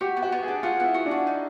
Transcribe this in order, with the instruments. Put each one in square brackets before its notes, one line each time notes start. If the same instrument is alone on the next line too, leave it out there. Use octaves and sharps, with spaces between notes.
[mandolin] F#4 [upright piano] G4
[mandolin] B3
[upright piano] F#4
[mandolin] B3
[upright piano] G#4
[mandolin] D4
[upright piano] F4 [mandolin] F#4
[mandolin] B3 [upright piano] E4
[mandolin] F#4
[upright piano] D4
[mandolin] F#4
D#4